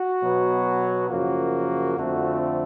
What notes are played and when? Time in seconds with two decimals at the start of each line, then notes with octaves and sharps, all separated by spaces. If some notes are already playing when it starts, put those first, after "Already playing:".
Already playing: F#4
0.22 B2 F#3 B3
1.09 F#2 C#3 F3 A#3 F#4
1.97 F2 D3 F3 A3 C4 F#4